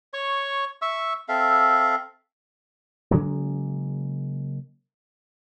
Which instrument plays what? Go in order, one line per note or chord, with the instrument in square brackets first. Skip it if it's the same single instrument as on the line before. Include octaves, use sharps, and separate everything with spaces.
[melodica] C#5 C#6
E5 C#6 E6
C4 A4 E5 F5
[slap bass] C#3 F#3 G#3 A#3